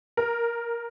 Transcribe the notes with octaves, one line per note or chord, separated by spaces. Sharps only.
A#4